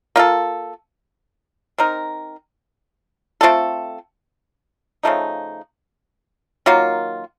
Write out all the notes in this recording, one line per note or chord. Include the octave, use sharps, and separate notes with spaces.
A#3 F4 A4
C4 D#4 A#4
A3 C4 F4 A4
C#3 F3 A3 D#4
D#3 F#3 A#3 F4